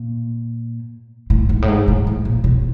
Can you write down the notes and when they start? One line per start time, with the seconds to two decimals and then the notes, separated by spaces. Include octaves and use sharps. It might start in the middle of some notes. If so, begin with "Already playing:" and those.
Already playing: A#2
1.30 A2
1.49 G#2
1.62 A2
1.68 G#2
1.88 A2
2.07 A2
2.25 A#2
2.44 B2